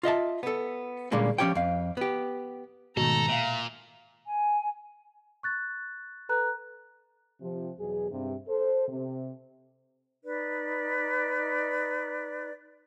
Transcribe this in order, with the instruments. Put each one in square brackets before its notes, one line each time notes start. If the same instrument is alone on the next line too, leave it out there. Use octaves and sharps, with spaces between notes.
[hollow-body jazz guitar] F4 D#5 E5 A5
B3 A4
A#2 D3 G3 G#3 A#3 C#4
F3 C#4 G4 C#5 G5
F2 F5
B3 G4
[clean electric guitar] G#2 D#3 A3 [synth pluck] B2 [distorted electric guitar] A4 [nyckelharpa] A#5
[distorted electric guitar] A#2 [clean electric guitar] E5 F5
[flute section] G#5
[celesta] C#6 F#6 A6
A4 B4 A#5 F#6
[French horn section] C3 F3
E2 B2 F#3 G#4
G2 C3
A4 C5
C3
[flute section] D#4 B4 D5